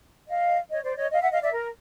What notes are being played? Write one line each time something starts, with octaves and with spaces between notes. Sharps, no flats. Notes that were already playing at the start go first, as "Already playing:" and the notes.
D#5 F5
C#5 D#5
C5 D5
C#5 D#5
D#5 F5
E5 F#5
D#5 F5
D5 E5
A#4